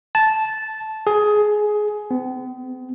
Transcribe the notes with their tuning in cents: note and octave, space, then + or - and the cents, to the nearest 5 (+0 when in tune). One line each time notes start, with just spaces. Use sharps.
A5 -10
G#4 +15
C4 -45